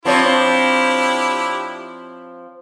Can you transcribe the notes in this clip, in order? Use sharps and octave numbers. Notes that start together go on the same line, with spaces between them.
F3 C4 D4 E4 G4 C#5